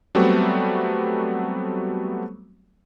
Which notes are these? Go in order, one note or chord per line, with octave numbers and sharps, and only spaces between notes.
F#3 G3 A3 B3 C4 F#4